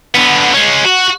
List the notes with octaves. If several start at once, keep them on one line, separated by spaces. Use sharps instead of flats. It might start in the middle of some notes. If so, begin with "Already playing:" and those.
D3 B3
G#3 C#4
F#4